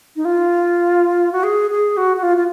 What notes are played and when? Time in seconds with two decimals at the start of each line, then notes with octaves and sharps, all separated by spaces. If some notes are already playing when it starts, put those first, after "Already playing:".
0.16 D#4
0.25 F4
1.32 F#4
1.43 G#4
1.71 G#4
1.97 F#4
2.17 F#4
2.23 F4
2.37 F4